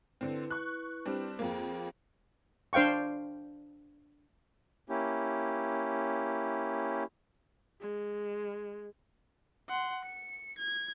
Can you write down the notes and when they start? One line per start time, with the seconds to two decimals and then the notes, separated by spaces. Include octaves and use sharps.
0.21 D3 C4 E4 B4
0.51 C#6 F#6
1.05 G3 C4 D4
1.39 F2 A#3 G#4 C5 G5
2.73 D4 C5 F5 G5 C#6
4.89 A#3 C#4 E4 G4
7.81 G#3
9.69 F#5 C6
10.05 C#7
10.59 G#6